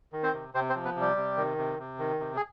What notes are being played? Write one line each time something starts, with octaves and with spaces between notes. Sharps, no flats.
D#3
C4 C5
C3
C3 C4 C5
C4 C5
F3
B3 B4
C3
G3 G4
C3
D#3
C3
C3
D#3
C3
G#4